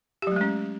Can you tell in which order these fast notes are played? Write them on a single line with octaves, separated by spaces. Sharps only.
G4 F#3 A3 G#3 C#4